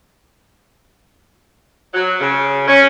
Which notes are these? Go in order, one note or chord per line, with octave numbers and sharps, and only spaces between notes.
F#3
C#3
C#4